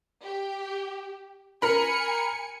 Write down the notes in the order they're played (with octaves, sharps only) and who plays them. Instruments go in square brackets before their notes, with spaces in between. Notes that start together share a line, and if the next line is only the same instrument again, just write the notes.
[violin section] G4
[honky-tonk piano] A#4 B5 [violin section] G#5 C#7